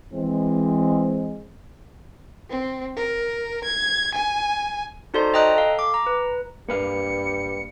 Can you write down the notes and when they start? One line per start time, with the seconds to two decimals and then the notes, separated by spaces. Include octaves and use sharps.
0.14 E3 G#3 C4
2.50 C4
2.96 A#4
3.64 G#6
4.15 G#5
5.14 D#4 F#4 A4 C5 D5 C6
5.34 D#5 G5 A#5 D#6 F#6
5.56 A4 F5
5.79 D6
5.94 A#5
6.07 B4
6.69 G2 G3 A#3 B4 F5 C#7